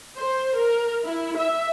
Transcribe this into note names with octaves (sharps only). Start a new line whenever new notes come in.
C5
A#4
E4
E5